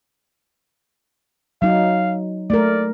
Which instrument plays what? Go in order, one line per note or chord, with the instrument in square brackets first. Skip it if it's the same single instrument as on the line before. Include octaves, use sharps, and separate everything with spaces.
[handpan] F#3 D#4 [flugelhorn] F5
[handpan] A3 A#4 [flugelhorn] D5